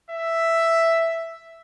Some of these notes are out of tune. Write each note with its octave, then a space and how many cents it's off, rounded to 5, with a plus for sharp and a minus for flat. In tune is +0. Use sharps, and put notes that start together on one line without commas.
E5 +5